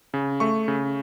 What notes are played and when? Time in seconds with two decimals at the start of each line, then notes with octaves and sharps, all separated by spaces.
0.14 C#3
0.40 A3 C#6
0.68 C#3